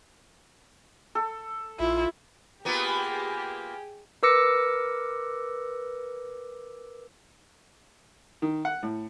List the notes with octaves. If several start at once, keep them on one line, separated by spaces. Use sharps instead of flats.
A4
A#1 E4 F4
A#3 B3 F4 G4 G#4
A#4 B4 D6 E6 A#6 C#7
D#3
F#5
A2